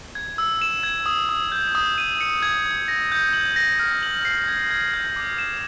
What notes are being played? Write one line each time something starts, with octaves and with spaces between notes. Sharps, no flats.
G#6
E6
E7
G#6
D#6
D#6
G6
D#6
D#7
C#7
G#6
G#6
A#6
G6
F#7
A#6
F6
F#7
C7
G#6
G#6
G6
D6
E7